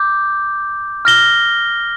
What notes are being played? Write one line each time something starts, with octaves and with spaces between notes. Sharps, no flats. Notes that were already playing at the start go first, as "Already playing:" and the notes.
Already playing: D6 G6
F6 A#6 G7